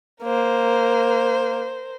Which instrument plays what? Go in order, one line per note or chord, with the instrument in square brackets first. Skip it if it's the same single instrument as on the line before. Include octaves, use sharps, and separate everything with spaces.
[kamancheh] A#3 [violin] A#4 C5